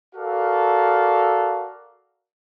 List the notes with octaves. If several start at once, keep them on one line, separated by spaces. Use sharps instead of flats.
F#4 A4 A#4 D5 F5